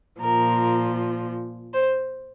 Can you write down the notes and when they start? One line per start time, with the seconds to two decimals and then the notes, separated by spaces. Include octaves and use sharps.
0.20 A#2 F3 A#4
1.73 C5